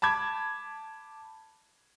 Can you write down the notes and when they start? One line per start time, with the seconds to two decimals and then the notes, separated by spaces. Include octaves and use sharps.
0.02 A5 B5 D6 G#6